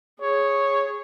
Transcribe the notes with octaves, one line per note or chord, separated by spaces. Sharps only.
G#4 C#5